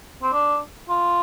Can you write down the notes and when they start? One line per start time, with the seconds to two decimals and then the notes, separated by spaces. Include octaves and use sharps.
0.23 C4
0.33 D4
0.90 F4